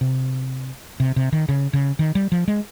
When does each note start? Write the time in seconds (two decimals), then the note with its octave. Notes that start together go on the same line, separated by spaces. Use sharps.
0.01 C3
1.00 C3
1.16 C3
1.32 D#3
1.49 C#3
1.73 C#3
1.99 D#3
2.15 G3
2.32 F3
2.48 G#3